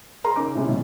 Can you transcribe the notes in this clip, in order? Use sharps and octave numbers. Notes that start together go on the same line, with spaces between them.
G#4 A#4 A#5 C6
C#3 C#4 D#4 D6
A2 C3 G#3 C#4
B1